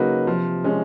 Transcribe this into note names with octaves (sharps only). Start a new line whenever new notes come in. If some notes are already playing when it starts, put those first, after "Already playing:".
Already playing: C#3 F#3 A#3 D#4 F#4 B4
C3 F3
G#3 C#4